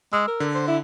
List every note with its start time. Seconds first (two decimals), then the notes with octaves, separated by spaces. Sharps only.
0.13 G#3 E6
0.28 A#4
0.40 D3
0.54 C5
0.68 E4